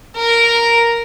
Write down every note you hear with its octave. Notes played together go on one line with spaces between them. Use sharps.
A#4